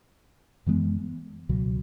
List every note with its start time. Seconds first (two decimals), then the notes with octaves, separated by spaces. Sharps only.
0.66 F#2 E3 G#3 B3
1.49 C#2 B2 F#3